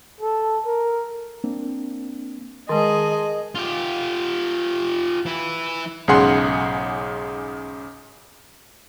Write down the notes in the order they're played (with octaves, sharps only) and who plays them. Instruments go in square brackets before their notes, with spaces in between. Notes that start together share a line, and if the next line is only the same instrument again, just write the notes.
[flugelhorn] A4
A#4
[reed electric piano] A#3 C4 D4
[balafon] D#3 G#3 [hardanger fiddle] G#4 [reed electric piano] A#4 A5 C6 [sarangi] D#5
[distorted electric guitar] F4 G4
E3 E4
[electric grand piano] B1 G#2 C#3 G#4 F#5 C6